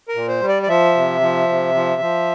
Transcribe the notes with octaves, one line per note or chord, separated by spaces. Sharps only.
A#4
A#2
C5
G3
D5
D5
F3 E5
C3
F3
C3
F3
F3